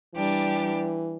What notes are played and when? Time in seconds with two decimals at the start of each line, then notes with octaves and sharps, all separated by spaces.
0.14 E3 G3 D4 G4